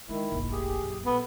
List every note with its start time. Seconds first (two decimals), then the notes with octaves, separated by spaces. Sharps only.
0.09 D#3 G#3 E4
0.32 F1 A#1
0.51 G4 G#4
0.83 F#2
1.06 A#1 B3 A4